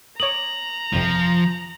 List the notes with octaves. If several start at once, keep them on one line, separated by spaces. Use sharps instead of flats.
C#5 A#5 D6 D#6 F#7
G1 F2 C3 F3